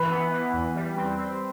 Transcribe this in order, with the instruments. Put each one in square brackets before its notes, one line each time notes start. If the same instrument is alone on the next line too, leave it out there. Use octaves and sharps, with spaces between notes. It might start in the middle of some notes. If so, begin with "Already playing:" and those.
Already playing: [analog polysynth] E3 [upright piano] B4
[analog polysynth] B3
E3
E2
G3
C4
C4